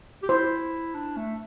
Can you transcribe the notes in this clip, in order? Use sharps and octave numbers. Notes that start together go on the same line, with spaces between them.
G4
E4 C5
D4
A3